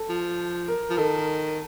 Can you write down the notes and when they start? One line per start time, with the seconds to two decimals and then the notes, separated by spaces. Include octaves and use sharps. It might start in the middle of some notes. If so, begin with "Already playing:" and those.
Already playing: A4
0.09 F3
0.68 A#4
0.90 F3
0.98 D#3 A4